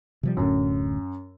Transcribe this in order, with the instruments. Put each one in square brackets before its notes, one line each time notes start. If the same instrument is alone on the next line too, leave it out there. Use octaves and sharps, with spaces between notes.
[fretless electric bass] C3 F3 G3
[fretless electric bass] D1 A2 D3 [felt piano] F#2